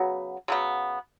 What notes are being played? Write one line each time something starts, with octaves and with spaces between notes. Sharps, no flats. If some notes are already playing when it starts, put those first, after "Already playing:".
Already playing: C#3 F#3 B3
C#3 F#3 B3